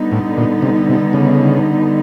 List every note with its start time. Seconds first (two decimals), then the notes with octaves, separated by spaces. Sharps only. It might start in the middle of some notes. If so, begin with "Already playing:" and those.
Already playing: D3 G3 B3 D#4
0.12 A2
0.37 A#2
0.62 C3
0.89 C3
1.13 C#3